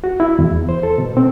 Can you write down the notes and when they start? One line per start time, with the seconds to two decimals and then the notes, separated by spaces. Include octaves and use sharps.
0.04 F#4
0.20 E4
0.39 E2
0.69 C5
0.83 A4
0.98 B2
1.17 C4